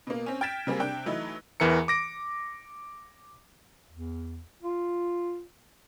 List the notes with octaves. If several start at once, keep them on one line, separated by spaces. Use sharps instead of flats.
B2 A#3
C4 C#4
G5 F6 G#6 A6 B6 E7
F#3 G3 A#3 C4 G#4
C3 D4 G5 F#6
E3 F#3 A3 D#4 E4
E2 E3 A#4 A#5 C#7
D6 A#6 D7
E2
F4